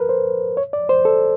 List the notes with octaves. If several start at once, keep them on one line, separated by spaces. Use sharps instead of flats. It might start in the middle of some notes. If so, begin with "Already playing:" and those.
Already playing: A#4 B4
C5
C#5
D5
C5
A4